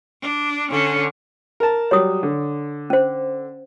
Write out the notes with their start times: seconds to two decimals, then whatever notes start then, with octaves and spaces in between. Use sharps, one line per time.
0.22 D4
0.70 D3 C#4
1.60 A#4 A5
1.91 F#3 G3 C#5 D#6
2.23 D3
2.90 C#4 C5